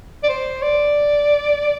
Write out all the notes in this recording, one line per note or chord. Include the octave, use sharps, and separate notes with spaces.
D5
C5
D5